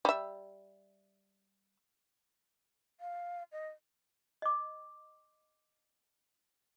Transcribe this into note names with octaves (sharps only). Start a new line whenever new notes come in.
G3 E5
F5
D#5
D#5 D6